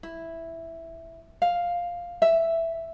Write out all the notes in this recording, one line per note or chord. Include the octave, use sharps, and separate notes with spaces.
E4
F5
E5